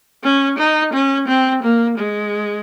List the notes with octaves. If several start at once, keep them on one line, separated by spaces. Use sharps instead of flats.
C#4
D#4
C#4
C4
A#3
G#3